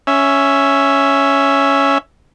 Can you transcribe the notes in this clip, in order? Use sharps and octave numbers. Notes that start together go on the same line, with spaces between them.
C#4 E5